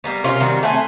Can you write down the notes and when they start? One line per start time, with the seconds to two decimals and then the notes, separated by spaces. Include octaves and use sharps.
0.04 G3 A#3 B3
0.24 C3 C#4 F4 A#4
0.40 D#3 G3 C4 F#4
0.63 A3 C4 F#5 G#5